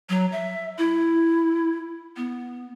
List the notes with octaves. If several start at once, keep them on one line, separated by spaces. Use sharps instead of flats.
F#3
E5
E4
B3